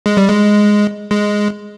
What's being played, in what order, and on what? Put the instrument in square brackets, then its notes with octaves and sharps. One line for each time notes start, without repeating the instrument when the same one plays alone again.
[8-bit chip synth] G#3
G3
G#3
G#3